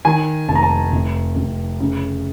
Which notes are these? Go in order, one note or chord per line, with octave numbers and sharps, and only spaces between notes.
D#3 G#5
F1 A5
A#5
A5
F1
F1
C#3